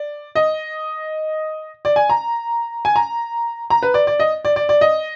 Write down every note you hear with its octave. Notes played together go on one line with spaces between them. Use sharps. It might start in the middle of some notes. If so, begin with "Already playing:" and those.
Already playing: D5
D#5
D5
G#5
A#5
G#5
A#5
A#5
B4
D5
D5
D#5
D5
D5
D5
D#5